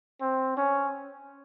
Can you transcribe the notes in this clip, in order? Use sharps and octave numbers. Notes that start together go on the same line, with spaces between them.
C4
C#4